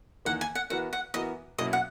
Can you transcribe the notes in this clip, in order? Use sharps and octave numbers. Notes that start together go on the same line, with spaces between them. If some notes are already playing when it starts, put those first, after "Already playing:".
E2 D#3 A#3 F#5
G#5
F#5
E3 B3 F#4 A#4 F#5
F#5
E3 B3 F#4 A#4 D#5
B2 F#3 A#3 C#4 E4 D#5
F#5